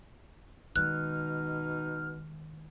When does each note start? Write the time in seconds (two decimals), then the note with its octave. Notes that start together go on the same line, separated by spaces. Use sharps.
0.76 B2 D#3 G#3 D#4 F6 F#6